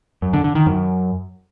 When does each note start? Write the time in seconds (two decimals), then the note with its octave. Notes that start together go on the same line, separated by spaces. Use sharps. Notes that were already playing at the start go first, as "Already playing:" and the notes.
0.22 F#2
0.33 D3
0.44 D3
0.55 D#3
0.66 F#2